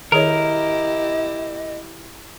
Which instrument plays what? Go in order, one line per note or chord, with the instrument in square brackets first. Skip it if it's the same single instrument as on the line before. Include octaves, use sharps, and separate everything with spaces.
[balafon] D#3 G#4 C#5 [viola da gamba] E4 G4 [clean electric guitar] A#4 [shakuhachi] D#5